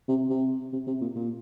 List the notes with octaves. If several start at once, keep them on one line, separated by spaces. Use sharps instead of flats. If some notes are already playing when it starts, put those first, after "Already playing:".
C3
C3
C3
C3
A#2
A#2